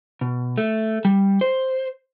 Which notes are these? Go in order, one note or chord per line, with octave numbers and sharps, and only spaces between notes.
B2
A3
G3
C5